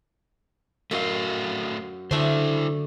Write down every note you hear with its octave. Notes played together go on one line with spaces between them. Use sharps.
F#2 A3 F#4 D#5 F5
D3 A3 D4 E4 C5 E5